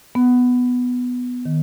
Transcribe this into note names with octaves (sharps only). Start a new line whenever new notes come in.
B3
D#3